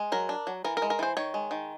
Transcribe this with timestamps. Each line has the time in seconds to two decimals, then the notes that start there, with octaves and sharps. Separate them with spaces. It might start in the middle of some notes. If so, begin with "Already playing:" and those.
Already playing: G#3
0.12 F#3 A#4
0.29 D4
0.47 F#3
0.64 E3 A#4
0.77 A#4
0.82 G#3
0.90 A#4
0.99 E3 C5
1.17 D#3 C#5
1.34 G#3
1.51 D#3